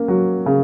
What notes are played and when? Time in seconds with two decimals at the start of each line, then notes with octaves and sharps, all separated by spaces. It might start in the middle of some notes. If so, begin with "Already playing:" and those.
Already playing: A#3 C#4
0.08 F#3
0.46 C#3